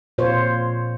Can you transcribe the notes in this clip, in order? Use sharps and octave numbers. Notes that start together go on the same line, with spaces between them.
A#2 F4 C5 C#5